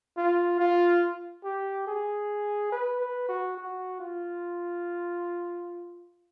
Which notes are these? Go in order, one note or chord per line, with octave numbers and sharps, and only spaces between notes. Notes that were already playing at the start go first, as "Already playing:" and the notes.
F4
F4
G4
G#4
B4
B4
F#4
F#4
F4